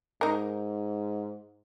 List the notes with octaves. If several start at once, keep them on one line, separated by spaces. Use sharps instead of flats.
G#2 D#4 A#4